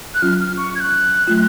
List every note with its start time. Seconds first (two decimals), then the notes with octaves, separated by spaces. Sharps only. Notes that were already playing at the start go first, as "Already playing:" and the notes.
0.14 F#6
0.22 F#3 C#4 F4 F6
0.40 F6
0.57 C#6
0.75 G#6
0.80 F#6
1.27 F#3 A3 F4